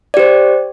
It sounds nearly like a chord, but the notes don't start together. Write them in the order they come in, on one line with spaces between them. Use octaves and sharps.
D5 G4 C5